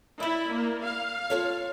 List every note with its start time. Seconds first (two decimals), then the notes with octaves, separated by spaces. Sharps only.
0.20 E4 D5 E5
0.52 A#3
0.84 F5
1.30 F4 A4 C#5